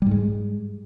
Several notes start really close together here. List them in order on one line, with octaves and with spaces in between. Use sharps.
G3 G#2 G#3